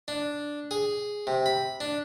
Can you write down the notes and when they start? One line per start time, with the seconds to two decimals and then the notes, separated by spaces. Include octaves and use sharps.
0.08 D4
0.71 G#4
1.27 C3
1.46 B5
1.80 D4